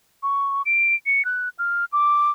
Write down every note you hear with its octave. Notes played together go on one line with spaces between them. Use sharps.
C#6
D7
C#7
F#6
F6
D6